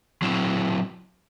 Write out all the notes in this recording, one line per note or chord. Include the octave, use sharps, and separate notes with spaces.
F#3 C4 E4